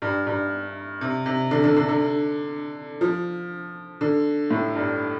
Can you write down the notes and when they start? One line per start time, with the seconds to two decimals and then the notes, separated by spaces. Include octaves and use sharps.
0.02 G2
0.27 G2
1.01 C3
1.26 C3
1.51 D3
1.63 D3
1.76 D3
1.89 D3
3.01 F3
4.01 D3
4.51 A2
4.75 G2